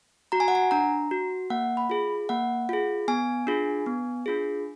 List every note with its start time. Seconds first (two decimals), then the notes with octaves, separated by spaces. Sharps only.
0.32 F#4 A#5
0.40 G#5
0.48 F#5
0.55 G#5
0.71 D4 A#5
1.11 F#4
1.50 A#3 F#5
1.77 B5
1.90 F4 G#4
2.29 A#3 F#5
2.69 F4 G#4
3.08 B3 G#5
3.47 D4 F4 G#4
3.86 B3
4.26 D4 F4 G#4